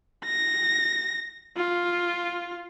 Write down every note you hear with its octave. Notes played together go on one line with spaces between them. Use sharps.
A#6
F4